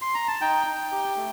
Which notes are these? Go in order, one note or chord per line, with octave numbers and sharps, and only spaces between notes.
C6
A#5
A5
D#4 G5
D#4
G4
A3